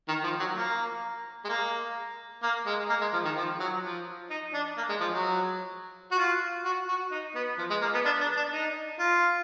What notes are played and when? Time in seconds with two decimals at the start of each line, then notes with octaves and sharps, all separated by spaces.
0.08 D#3
0.23 F3
0.39 F#3
0.55 A#3
1.44 G#3
1.48 A#3
2.43 A#3
2.66 G#3
2.89 A#3
3.01 G#3
3.13 F3
3.25 D#3
3.36 F3
3.60 F#3
3.83 F3
4.30 D#4
4.53 D4
4.77 A#3
4.89 G#3
5.00 F3
5.12 F#3
6.11 F#4
6.18 F4
6.65 F#4
6.88 F#4
7.11 D#4
7.35 B3
7.58 F3
7.70 G#3
7.82 A#3
7.94 B3
8.05 D4
8.21 D4
8.36 D4
8.52 D#4
8.99 F4